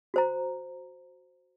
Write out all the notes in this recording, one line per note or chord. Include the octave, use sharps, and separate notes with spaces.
F#4 C5 A#5